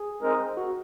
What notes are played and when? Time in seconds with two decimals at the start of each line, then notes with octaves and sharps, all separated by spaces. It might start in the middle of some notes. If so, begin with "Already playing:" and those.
Already playing: G#4
0.21 G#3 C4 D#4 A#4 D#5
0.57 F#4